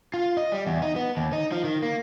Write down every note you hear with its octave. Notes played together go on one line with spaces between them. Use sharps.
F4
D#5
G3
E2
D#4
B3
D#2
D#4
F3
D#3
A#3